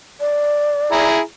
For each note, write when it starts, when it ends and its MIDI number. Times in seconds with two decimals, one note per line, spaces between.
0.20 1.04 74
0.92 1.19 64
0.92 1.19 68
0.92 1.19 82